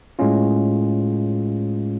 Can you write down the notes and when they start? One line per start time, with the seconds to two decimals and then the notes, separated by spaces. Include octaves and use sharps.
0.19 A2 G#3 C#4 F4